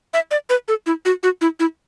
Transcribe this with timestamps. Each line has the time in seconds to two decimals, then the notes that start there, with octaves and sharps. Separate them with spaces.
0.14 E5
0.31 D5
0.50 B4
0.68 A4
0.86 E4
1.05 F#4
1.23 F#4
1.41 E4
1.60 E4